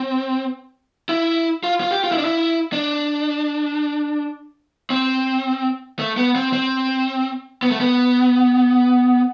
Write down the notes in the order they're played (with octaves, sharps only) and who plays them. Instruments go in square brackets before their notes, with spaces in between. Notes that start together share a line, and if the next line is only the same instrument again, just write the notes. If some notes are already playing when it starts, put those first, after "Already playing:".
Already playing: [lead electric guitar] C4
E4
F4
F4
G4
F4
E4
D4
E4
D4
C4
A3
B3
C4
C4
B3
A3
B3